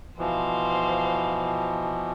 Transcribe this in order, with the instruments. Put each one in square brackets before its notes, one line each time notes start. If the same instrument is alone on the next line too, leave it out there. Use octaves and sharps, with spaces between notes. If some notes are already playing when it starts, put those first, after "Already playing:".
[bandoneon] B2 E3 F3 [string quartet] C5 F5